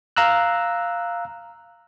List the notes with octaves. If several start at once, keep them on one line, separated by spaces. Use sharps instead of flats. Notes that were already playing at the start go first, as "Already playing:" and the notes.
F5 A#5 E6 F#6